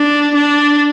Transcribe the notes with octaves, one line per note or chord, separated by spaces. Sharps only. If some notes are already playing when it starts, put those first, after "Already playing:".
Already playing: D4
D4